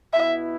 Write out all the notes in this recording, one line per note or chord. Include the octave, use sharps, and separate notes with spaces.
B2 B3 E4 E5